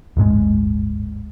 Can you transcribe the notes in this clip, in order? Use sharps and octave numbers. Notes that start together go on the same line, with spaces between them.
D1 G1 G#2 G#3